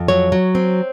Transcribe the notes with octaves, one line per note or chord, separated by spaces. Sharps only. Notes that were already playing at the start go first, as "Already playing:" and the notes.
Already playing: F2
F#3 C#5
F#3
C4